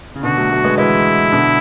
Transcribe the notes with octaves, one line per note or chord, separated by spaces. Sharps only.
C#3
B2 D3 F#4
F#3 A3
F#3 A3
G#3 B3
E3 G#3 E4
B2 D3